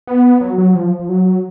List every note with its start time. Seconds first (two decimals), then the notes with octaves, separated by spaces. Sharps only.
0.07 B3
0.41 F#3
0.58 F#3
0.75 F3
1.00 F3
1.09 F#3